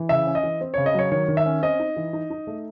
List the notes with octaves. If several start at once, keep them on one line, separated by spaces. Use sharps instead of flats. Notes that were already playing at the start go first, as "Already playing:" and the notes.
Already playing: E3
C#3 E5
C#4
D#5
E3
C4
C#3 C#5
D#5
F#3 C#5
D#3 C#5
D#3
E5
C#4
C4 D#5
D#4
E3
D#4
D#4
A3